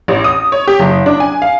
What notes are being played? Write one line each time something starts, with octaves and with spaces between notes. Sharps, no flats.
A1
D#6
C#5
G4
F#1
D4
G#5
F5